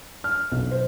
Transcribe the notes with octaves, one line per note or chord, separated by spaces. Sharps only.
F6
B1
C5